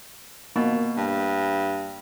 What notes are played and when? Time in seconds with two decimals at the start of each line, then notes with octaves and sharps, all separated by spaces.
0.56 B2 A#3
0.97 G2